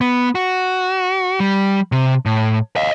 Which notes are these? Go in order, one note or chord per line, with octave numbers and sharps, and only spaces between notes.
B3
F#4
G3
C3
A2
D#5 F5